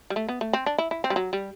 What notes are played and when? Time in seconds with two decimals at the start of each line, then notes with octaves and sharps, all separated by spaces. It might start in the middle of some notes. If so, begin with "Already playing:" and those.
0.10 G3
0.16 A3
0.29 B3
0.41 A3
0.53 C4
0.66 D4
0.78 E4
0.91 E4
1.04 C4
1.10 G3
1.16 F#3
1.33 G3